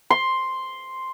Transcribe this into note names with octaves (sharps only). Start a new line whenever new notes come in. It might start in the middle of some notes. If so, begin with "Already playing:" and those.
C6